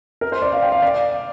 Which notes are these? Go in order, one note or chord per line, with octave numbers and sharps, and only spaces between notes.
A#4
C5
D5
F5
G5
F5
D5